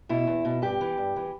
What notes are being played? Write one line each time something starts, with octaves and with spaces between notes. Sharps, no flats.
B2 E4
E2
B2
G2 G4
E3
G2
E3